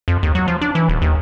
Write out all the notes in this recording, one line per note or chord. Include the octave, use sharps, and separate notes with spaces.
F2
D#2
F#3
F3
D4
E3
D#1
D#2